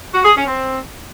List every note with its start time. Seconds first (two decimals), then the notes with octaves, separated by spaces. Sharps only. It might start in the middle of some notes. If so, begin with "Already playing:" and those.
0.13 F#4
0.24 G#4
0.35 C#4
0.47 C4